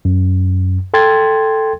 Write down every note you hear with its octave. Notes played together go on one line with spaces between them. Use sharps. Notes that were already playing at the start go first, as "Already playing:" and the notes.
F#2
A4 G5 C6 G#6 A6